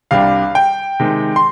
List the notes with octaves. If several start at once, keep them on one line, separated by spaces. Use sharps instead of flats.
C2 C3 G3 D4 F5
G5
C3 D#3 G#3
C6